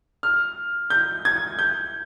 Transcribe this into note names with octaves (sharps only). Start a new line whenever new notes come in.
F6
G6
G#6
G6